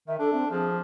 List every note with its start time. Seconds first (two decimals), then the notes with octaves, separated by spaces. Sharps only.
0.08 D#3 E5
0.19 D4 A4
0.33 C4
0.51 F3 G#4